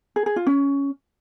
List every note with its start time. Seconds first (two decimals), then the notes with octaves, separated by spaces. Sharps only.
0.16 G#4
0.26 G#4
0.36 F4
0.47 C#4